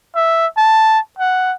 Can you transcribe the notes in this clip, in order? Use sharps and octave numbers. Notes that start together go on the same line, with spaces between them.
E5
A5
F#5